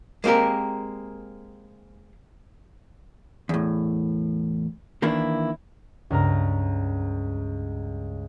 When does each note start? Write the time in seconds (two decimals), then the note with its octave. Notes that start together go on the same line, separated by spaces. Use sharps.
0.24 G#3 A#3 C4 G4 A#4
3.49 E2 A2
5.02 D#3 E3 A#3 D4 E4
6.10 C#2 G2 A#4 B4 A#5